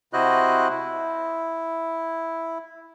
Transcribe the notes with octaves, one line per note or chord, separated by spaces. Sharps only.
C3 E4 F#4 C5 D#5 F#6
E4